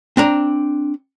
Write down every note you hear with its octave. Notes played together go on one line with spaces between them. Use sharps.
C4 D4 A#5